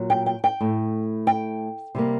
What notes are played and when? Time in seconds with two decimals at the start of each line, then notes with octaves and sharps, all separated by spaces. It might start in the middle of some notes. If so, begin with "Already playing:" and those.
Already playing: A#2 F#3
0.10 G5
0.26 G5
0.44 G5
0.60 A2 A3
1.27 G5
1.95 C3 G3 A#3